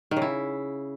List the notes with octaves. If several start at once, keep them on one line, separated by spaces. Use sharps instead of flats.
D#3
C#3
E4